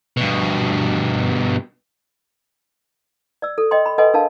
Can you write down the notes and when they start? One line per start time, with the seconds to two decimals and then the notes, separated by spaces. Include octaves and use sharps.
0.17 G2 B2
3.42 D5 E6
3.58 A4
3.71 D#5 G5 C6
3.86 B5
3.98 A4 B4 D#5 F#5 G#5 C6
4.14 D4 A#4 F5 A5